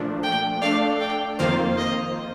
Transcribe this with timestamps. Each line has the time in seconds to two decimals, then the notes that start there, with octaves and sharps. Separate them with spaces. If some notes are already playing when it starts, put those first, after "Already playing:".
Already playing: A#2 F3 A3 D4
0.23 G5
0.62 A3 D4 A4 D5 F5
1.00 G5
1.39 F2 D#3 A#3 F4 C5 F5
1.78 D#5